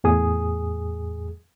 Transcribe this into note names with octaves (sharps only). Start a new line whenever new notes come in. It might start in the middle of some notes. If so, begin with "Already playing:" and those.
E2 A2 G#4 D#6